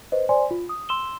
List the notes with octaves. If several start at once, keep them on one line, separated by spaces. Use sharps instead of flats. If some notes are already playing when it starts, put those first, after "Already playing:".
B4 C5 D#5
C5 D5 G#5 C6
F4
D#6
C6 E6 E7 G7